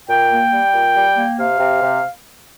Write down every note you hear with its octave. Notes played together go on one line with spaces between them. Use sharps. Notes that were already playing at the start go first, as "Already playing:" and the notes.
A#2 G5
A#3
G3
A#2
G3
A#3
C3 F5
C3
C3